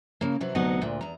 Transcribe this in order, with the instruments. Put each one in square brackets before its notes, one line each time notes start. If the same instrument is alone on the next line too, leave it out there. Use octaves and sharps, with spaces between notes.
[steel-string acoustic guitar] C#3 A#3
C3 E3 F#3
D2 C3 F#3 B3 D#4 F#5
D2 A#2
E2 A#5